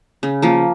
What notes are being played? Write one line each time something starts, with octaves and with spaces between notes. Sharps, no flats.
C#3
F3 A#3